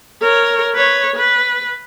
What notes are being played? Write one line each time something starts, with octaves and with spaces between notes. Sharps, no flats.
A#4 C#5
B4 C#5
B4